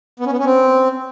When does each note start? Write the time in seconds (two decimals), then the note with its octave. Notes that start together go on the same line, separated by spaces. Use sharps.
0.20 B3
0.26 C#4
0.33 B3
0.39 C#4
0.46 C4